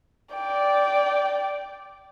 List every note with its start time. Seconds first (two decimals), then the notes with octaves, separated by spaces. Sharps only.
0.33 D5 G5